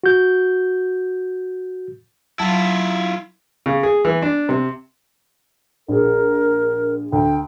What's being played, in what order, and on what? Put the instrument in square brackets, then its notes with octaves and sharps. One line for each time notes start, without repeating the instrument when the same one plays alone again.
[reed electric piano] F#4 G6
[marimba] F#3 A5 [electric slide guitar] E4 F4
[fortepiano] C#3
G#4
E3
D4
C3
[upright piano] A#1 G#4 [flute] A#4
[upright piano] D2 [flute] G5